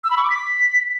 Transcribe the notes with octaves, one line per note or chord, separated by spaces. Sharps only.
E6
B5
C#6
D6
B6